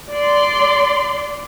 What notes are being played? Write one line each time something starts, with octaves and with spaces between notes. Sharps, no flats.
D5 C6